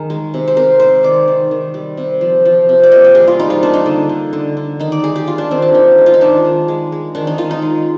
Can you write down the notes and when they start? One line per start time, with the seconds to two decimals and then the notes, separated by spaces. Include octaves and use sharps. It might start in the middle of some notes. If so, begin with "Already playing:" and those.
Already playing: D#3 G#4 A#4
0.10 G#3
0.34 C3
0.48 C5
0.56 C3 A#4
0.80 G#3 C5
1.03 D#3 D5
1.28 D#3
1.51 D#3
1.74 G3
1.97 C3
2.21 F3
2.45 F3
2.69 C3
2.83 D5
2.92 A#3 D#5
3.04 G5
3.15 G3 G#4
3.28 F4
3.39 G3 D#4
3.50 F4
3.63 A#3 D4
3.74 D#4
3.86 D3
4.09 D3
4.33 D3
4.57 D3
4.80 D#3 D#4
4.92 D5
5.03 G#3 G#4
5.16 G4
5.26 G#3 F4
5.38 D4
5.51 D#3 C4
5.62 D4
5.74 D#3 D#4
5.98 G#3
6.06 F4
6.14 D#4
6.21 D#3 D4
6.45 D#3
6.68 G#3
6.92 G#3
7.15 D#3 D4
7.27 D#4
7.38 D#3 F4
7.51 D#4
7.62 G#3